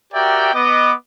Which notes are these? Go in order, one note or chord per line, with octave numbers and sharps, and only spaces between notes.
F#4 G4 A#4 D5 E5 G5
B3 D#5 D6